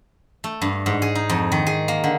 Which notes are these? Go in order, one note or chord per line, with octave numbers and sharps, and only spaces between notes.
A3
G2
G#2
G#4
D#4
F2
D#3
G#4
A#3
D3